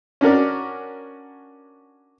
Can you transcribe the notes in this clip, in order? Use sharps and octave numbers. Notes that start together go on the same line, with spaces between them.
C#4 D4 F#4 A#4 D5